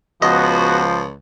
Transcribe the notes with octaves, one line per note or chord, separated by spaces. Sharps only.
C#2 F3 B3 F#4 D#5